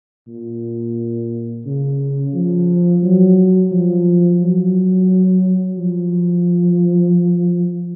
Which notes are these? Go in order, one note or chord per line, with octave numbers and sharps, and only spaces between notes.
A#2
C#3
F3
F#3
F3
F#3
F3